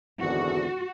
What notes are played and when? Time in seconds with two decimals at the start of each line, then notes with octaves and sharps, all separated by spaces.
0.20 G#1 E2 D3 F#4